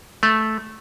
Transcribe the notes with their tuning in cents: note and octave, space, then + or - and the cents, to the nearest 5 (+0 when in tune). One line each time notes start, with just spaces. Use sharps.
A3 -10